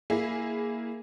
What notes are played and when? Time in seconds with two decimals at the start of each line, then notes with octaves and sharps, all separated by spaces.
0.10 A#3 E4 G#4